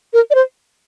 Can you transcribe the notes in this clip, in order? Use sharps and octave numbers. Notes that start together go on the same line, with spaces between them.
A#4
D5
C5